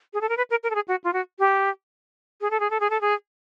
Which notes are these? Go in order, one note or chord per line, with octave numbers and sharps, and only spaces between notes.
G#4
A4
A#4
B4
A#4
A#4
A4
G#4
F#4
F4
F#4
G4
G#4
A4
G#4
A4
G#4
A4
G#4